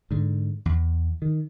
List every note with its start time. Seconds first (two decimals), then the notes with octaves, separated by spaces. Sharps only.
0.11 G#2 D3
0.66 E2
1.22 D#3